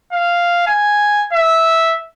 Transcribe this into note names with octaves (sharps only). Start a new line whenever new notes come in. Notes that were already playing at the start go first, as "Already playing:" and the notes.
F5
G#5
E5